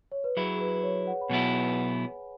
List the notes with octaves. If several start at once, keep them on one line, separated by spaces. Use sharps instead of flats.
C#5
B4
F#3 E4 G#4
G#4
B4
B4
C#5
F#5
B5
B2 F#3 B3 E4 G#5
F#5